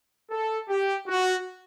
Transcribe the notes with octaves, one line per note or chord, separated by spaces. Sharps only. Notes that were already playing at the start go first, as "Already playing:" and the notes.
A4
G4
F#4